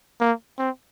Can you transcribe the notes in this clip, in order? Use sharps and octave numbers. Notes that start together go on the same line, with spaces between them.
A#3
C4